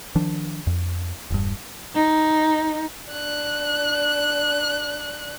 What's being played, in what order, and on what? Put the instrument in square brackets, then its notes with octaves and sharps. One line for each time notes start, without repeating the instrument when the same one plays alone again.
[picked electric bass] D#3 F3 D4
F2
E1 G2
[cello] D#4
[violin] D4 F#6